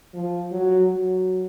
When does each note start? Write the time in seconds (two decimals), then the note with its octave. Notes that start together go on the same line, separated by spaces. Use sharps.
0.14 F3
0.51 F#3
0.88 F#3